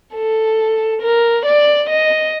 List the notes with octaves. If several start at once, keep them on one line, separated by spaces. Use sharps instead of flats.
A4
A#4
D5
D#5